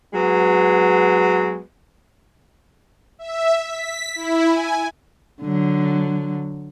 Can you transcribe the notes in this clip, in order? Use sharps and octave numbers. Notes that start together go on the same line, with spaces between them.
F#3 G#3 B3
E5
B6
E4
G#5
D3 F#3